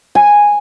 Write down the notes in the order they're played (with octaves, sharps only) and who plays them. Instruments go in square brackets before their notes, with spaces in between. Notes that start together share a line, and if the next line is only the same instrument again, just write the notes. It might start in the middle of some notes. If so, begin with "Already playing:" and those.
[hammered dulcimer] G#5